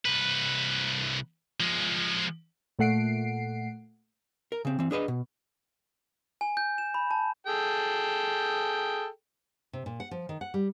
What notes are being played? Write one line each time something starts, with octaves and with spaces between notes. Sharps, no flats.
C2 B4
F3 G#3
A#2 A3 F#5 C7 D7
A#4
C#3 C4
E3 C4
D4 G#4 B4 D#5
B2
G#5
G6
E7
B5
A5
G#4 A4 G5
C3
A#2
F#5
F3
D#3
F#5
G3